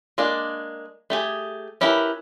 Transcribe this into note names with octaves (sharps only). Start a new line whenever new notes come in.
G#3 A#3 D4 D5
A3 G4 G#4
C#4 E4 G4 A#4 B4